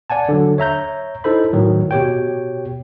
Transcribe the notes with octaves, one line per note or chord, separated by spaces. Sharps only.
D5 F#5 G#5 A5
D3 F#3
C#5 E5 A#5 G6
D#4 E4 A4 C5 B5
A2 D#3 F#3
B2 G4 C#5 G5